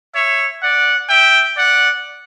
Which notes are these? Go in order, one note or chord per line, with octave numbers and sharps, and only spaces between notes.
C#5 E5
D5 F#5
E5 G5
D5 F#5